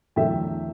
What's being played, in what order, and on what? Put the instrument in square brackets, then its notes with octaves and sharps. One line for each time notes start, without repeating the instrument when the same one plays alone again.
[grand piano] E2 D3 F#3 A3 E5 G5